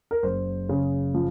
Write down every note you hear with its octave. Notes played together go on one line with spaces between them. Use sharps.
A#4
F#1 C5
C#3
F3